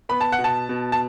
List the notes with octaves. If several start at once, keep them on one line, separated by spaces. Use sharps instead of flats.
B3 B5
A5
F#5
B2
A5
B2
A5